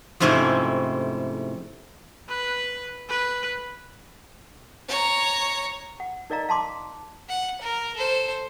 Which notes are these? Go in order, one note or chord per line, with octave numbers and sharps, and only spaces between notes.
F2 G#2 C3 A3 C#4 E4
B4
B4
C#5 A#5
F#5
D#4 A#4 D5 D#5 F5 A#5
F5 A5 C6 D6
F#5
A#4
A4 C5